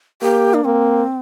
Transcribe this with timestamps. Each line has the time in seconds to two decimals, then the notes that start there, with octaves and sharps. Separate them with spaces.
0.22 A#3 G4
0.54 D4
0.65 A#3 C4